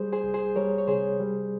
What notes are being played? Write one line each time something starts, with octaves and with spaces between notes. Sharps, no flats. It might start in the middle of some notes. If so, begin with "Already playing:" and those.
Already playing: G3 G#4 C5
G#4 C5
C2
G#4 C5
G3 A#4 C#5
C#5
C3 G#4 C5
G3